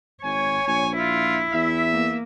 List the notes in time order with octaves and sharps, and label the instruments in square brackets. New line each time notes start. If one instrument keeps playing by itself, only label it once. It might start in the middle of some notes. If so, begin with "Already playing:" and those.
[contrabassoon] G#1 [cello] C#5 [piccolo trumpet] G#5
[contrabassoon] A#1 [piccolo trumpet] G#5
[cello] E4 [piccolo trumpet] F4
[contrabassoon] E2 [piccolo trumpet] E5
[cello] A#3